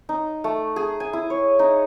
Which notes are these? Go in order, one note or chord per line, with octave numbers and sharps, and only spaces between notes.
D#4
A3
G#4
G#5
E4
C#5
D#4